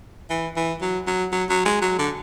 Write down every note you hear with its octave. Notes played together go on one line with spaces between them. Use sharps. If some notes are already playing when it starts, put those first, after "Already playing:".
E3
E3
F#3
F#3
F#3
F#3
G#3
F#3
D3